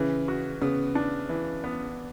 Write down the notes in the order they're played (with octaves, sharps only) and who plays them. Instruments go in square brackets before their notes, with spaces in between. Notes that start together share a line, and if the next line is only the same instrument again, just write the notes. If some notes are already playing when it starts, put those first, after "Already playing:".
Already playing: [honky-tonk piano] C#3 [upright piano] E3
[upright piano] F#4
[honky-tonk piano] C#3 [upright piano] B3
[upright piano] D4
E3
B3